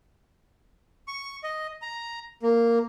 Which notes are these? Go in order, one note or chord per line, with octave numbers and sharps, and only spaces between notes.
C#6
D#5
A#5
A#3